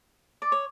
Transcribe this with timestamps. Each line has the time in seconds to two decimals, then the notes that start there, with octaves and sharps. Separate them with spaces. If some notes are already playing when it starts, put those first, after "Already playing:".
0.42 D5
0.52 C#5